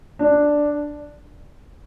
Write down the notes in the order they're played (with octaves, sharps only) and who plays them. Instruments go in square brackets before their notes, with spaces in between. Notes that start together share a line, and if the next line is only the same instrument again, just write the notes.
[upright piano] D4